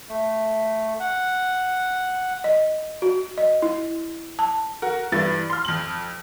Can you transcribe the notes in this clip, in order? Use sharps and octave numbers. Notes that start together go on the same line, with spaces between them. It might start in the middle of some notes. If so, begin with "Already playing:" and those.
A3
F#5
D#5
F#4
D#5
E4
A5
F#4 A#4
G2 E3 A6
C6 F6
F2 F#7